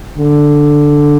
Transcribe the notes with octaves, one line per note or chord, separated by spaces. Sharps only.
D3